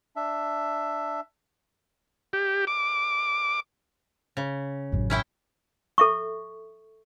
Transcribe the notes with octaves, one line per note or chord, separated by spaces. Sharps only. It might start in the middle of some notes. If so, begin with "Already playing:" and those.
D4 E5
G4
D6
C#3
A1 F#2
C#4 E4 G5
A4 E5 C#6